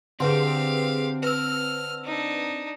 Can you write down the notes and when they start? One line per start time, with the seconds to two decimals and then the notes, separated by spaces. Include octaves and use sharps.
0.20 D3 C4 G4 G#4 B4 F5 C6
1.23 B4 E6 F6
2.04 D4 D#4